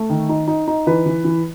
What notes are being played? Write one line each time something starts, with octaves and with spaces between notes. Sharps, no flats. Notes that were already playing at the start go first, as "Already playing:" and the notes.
Already playing: A3
D#3
D#4
D#4
D#4
E3 B4
E3
E3